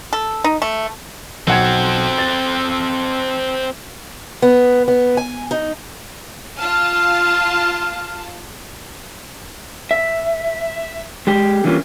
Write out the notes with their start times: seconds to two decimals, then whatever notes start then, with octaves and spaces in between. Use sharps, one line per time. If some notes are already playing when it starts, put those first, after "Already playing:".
0.13 A4
0.44 D#4
0.62 A3
1.47 B1 C4 A4 F#5 G#6
2.18 A6
4.42 B3
4.88 B3
5.17 G#5
5.51 D#4
6.58 F4 A5 F6
9.91 E5
11.27 G#3 G4
11.64 D3 E3 G3 A#3 C#4 F4